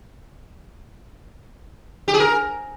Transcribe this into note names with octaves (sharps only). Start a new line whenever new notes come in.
G4
G#4
A#4